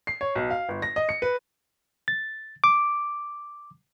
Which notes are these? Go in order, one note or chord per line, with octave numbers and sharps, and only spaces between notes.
C7
C#5
B1
F5
G1
A#6
D#5
C#7
B4
A6
D6